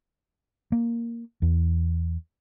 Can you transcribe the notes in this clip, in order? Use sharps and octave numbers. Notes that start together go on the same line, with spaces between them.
A#3
E2